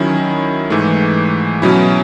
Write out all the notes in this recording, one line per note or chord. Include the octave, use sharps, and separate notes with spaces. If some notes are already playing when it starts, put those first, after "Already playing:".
Already playing: D#3 F#3 C#4 E4
G#2 E3 A3
B2 F#3 C#4 E4